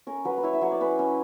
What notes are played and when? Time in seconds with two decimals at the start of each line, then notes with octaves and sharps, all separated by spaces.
0.07 C#4 A#4
0.25 F#3 B4
0.38 B4
0.43 E4 C#5
0.53 E5
0.62 F#3 C#5
0.72 D5
0.81 C#4 B4
0.99 C#4